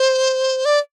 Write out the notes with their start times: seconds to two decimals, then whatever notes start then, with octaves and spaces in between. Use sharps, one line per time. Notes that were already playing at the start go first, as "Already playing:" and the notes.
Already playing: C5
0.65 D5